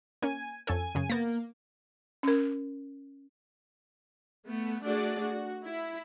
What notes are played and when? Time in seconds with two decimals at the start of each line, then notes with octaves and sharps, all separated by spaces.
0.22 A#3 C#4 G#5
0.67 F2 C#4 A4 G#5
0.95 F#2 C#3
1.10 A#3 B3 A6 A#6
2.23 C#4 A#4
4.46 A3 B3
4.84 A3 D4 F#4 G#4 D5
5.20 F#4
5.66 E4